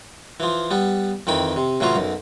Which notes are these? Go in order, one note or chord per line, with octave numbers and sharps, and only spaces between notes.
E3 F3
G3 B3
F2 D#3 E3 G5 B5
C3
A2 C#3 E3 F#3 F4
B1 F#2